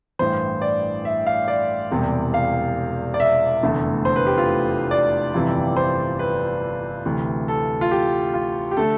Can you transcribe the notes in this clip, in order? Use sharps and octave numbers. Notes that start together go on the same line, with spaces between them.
A1 G2 E3 C5
D5
E5
F5
D5
E1 E2 C3 G3 C4
F5
D5
E5
F1 E2 D3 A3
C5
B4
G4
F4
D5
G1 F2 C3 E3
C5
B4
D2 C3 E3
A4
F4
G4
F4
G4
D3 A3 A4